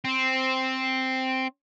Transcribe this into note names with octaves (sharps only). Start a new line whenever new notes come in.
C4